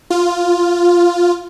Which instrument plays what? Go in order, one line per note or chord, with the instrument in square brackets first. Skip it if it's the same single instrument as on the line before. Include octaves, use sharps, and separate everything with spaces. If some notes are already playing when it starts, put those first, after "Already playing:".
[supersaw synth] F4